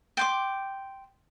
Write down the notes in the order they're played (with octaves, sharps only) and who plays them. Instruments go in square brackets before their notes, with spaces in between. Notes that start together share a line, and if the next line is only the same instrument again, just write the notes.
[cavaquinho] G5 C6 D6